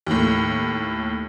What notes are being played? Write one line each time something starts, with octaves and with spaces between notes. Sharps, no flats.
D#2 A2